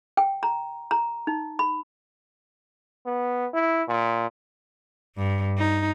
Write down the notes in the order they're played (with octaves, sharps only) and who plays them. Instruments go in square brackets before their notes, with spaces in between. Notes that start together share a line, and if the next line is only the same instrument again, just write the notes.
[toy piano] G5
A#5
A#5
D#4
B5
[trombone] B3
E4
A#2
[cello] G2
D#4